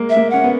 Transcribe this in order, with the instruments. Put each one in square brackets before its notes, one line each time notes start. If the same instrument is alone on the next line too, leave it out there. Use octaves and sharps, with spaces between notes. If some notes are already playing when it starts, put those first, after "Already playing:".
Already playing: [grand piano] G#3 A#3
[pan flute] E5
[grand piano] A#3
[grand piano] C#4 [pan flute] F#5
[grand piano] B3